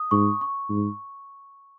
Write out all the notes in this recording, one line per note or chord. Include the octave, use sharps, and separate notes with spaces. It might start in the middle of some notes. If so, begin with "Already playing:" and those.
Already playing: D#6
G#2 C#6
C#6
G#2